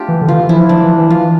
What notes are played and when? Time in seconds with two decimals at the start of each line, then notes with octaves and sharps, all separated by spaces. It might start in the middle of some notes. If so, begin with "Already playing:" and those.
Already playing: A3 C4 D4 F4 G4
0.08 E3
0.22 D3
0.28 E3 F4
0.49 F3 E4
0.69 F3 D4
0.83 E3
0.97 E3
1.10 E3 F4